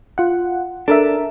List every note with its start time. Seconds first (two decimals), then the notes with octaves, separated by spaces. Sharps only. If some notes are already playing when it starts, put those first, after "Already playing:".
0.18 F4 F#5
0.88 D4 A4 A#4 E5